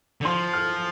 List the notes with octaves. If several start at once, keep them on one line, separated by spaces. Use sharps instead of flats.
D3
F3 C6
F6